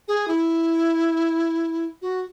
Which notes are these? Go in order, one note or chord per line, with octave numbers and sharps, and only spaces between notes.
G#4
E4
F#4